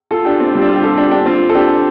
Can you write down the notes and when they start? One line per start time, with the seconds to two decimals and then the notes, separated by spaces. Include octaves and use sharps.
0.11 F4 A4
0.25 D4 G4
0.40 C4 F4
0.54 G3 C4
0.62 D4
0.69 F4
0.76 G4
0.83 F4 A4
0.97 D4 G4
1.11 D4 G4
1.26 C4 F4
1.49 A4
1.54 D4 G4